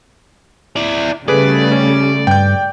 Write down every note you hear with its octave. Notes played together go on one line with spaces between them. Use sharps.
E4 D5
C#3 G3 A3 G#4 B4 D5
C#4
G2 G5 G6